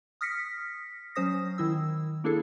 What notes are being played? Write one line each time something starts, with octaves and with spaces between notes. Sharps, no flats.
D#6 F6 A#6 B6 C#7
F#3 C#4 C5 D#6 A#6
D#3 E4 E6
A#3 D4 E4 G#4 A4